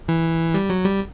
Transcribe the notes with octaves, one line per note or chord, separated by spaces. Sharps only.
E3
G3
F#3
G3